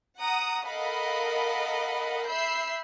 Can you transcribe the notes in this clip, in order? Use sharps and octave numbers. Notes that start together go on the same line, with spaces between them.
F#5 A#5 D#6
A4 A#4 D#5 F5 F#5 B5
E5 B5 E6 G6 C7